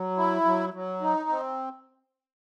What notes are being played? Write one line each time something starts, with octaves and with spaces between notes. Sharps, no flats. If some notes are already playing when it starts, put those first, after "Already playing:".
Already playing: F#3
E4
F#3
F#3
D#4
C4